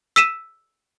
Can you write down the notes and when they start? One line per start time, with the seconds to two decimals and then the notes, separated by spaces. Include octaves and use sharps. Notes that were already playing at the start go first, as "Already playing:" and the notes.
0.16 E6 B6 D#7 E7